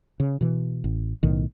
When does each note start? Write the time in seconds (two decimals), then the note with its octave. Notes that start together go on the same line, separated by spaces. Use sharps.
0.20 C#3
0.41 B2 E3
0.84 A1
1.23 B1 A2 D#3